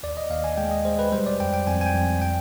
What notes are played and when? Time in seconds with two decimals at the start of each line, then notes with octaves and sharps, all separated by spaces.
0.03 D#2 D5
0.17 D#5
0.30 D#2 F5
0.44 G#5
0.58 G#3 G5
0.71 D#5
0.85 G#3 C5
0.99 B4
1.12 G3 C5
1.26 D5
1.40 F2 G5
1.54 G5
1.67 F2 G#5
1.81 G#5
1.86 G5
1.94 F2
2.22 G5